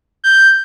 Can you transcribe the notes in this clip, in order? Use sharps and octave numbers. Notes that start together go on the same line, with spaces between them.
G6